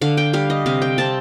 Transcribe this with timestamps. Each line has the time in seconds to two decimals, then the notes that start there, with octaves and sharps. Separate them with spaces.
0.01 D3 F5
0.17 G5
0.33 G3 F5
0.50 D#5
0.66 C3 F5
0.82 G5
0.98 C4 A5